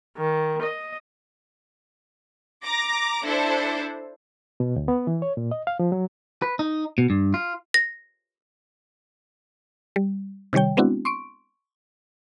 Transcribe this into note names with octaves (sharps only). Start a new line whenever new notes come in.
D#3
D#5
A#5 D6 A#6
D4 E4 A4 C5
B2
D2
B3
E3
C#5
A#2
D#5
F5
F3
F#3
B4
D#4
B2
G2
F4
A#6
G3
C3 D#3 G3 C#5 G5
G#3 B3 C4 D4 E4 F#4
C6 C#6 D7